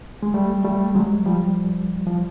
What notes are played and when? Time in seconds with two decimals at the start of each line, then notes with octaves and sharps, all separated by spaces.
0.23 G#3
0.34 G3 A3
0.65 G3 A3
0.95 F#3 G#3
1.25 F3 G3
2.07 F3